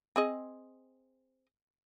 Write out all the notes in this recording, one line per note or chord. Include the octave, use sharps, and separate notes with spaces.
C4 G#4 D#5